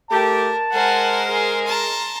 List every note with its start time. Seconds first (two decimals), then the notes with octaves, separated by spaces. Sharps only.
0.11 A3 G4 A#4 A5
0.73 G#3 A#4 C5 F#5 G#5
1.29 G#4
1.67 A5 A#5 C6